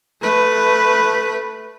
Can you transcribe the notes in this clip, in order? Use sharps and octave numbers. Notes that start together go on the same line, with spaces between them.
A3 B4